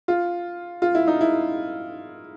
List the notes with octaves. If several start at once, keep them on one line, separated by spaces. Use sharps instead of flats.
F4
F4
E4
D#4
E4